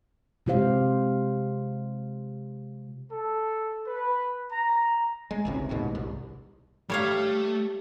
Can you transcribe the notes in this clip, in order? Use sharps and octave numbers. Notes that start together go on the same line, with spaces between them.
C3 G#3 F4 G4 C5 F5
A4
B4
A#5
G#3
G#1 C#2 C3
A1 D#2 G#2 B2
C2
G3 A3 C#5 F5